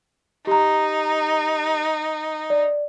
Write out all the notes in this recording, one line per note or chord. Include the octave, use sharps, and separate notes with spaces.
D#4 G4 A#5
D5